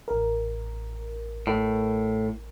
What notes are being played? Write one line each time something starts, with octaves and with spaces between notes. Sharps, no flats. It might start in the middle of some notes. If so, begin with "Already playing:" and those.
A1 A#4
A2